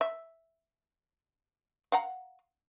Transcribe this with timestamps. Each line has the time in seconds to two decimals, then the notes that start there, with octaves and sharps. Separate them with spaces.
0.01 E5
1.92 F5 F#5 A#5